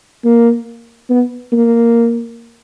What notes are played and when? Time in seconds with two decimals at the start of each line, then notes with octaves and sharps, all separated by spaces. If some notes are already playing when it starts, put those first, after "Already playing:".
0.24 A#3
1.10 B3
1.52 A#3